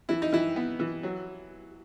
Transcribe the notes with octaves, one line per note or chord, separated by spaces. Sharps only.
E3 E4
D#4
E3 E4
B3
E3
F#3